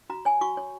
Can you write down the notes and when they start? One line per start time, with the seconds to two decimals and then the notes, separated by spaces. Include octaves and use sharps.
0.10 F#4 A#5
0.25 C#5 G#5
0.41 F#4 C#6
0.57 C#5